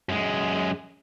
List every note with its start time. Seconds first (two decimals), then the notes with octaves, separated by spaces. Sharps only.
0.09 F#2 G#3